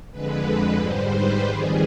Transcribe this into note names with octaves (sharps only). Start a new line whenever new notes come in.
F2 D3 G#3 B4
B4
G#2 G3 C5
B4
F2 D#3 G3 G#4